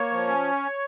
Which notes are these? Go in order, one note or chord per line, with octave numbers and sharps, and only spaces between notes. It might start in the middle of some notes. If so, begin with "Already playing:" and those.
Already playing: A#3 C#5
F3
C#4